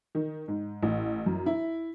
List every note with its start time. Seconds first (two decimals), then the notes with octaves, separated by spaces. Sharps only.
0.15 D#3
0.48 G#2
0.83 A1
1.26 F#2
1.46 E4